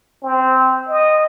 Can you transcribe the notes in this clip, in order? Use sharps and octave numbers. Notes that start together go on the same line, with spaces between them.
C4
D#5